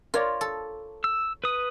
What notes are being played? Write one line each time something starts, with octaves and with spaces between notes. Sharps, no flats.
F4 A#4 C#5 D5
A4
E6
B4 D#6